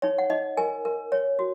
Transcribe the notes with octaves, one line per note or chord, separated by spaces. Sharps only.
D#4 C#5
F#5
D#4 D#5
A#4 G#5
A#4
C#5
F#4